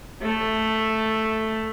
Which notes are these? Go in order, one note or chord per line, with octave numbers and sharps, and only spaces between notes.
A3